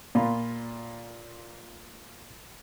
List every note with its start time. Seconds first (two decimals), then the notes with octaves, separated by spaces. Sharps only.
0.15 A#2 F4 B5